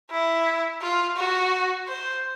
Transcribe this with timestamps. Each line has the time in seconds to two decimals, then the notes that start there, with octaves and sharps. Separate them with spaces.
0.10 E4
0.82 F4
1.17 F#4
1.88 C5